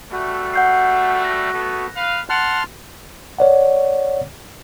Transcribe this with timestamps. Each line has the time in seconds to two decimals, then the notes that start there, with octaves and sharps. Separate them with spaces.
0.12 G3 A3 F#4
0.54 F#5 G6 C7
1.22 F#6 A#6
1.53 A3 B3
1.96 B4 F5
2.30 F#5 A5 C6 F6
3.38 C#5 D5 F#5